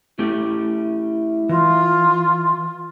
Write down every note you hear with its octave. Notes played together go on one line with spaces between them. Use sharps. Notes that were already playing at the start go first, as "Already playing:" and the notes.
A3 C#4 E4 G4
E3 F4